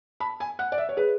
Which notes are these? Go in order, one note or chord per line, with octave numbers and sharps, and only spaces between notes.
A5 B5
G#5
F#5 F#6
D5
E5
C#5
G#4 B4